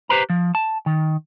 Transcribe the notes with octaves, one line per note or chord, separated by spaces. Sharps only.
G4 B4 C5 A#5
F3
A5
D#3